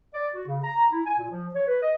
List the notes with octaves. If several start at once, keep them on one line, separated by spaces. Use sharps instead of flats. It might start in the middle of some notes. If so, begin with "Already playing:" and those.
D5
F#4
C#3
A#5
E4
G#5
A#2
F3
C#5
B4
D#5